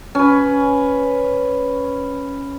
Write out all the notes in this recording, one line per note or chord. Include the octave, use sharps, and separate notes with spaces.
C#4 B4